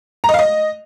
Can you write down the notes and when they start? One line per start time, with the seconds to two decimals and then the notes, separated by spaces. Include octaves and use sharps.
0.24 A#5
0.29 D#5
0.34 F5
0.39 D#5